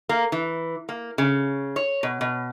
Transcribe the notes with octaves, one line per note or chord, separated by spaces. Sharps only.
A#3
E3
A#3
C#3
C#5
B2
B2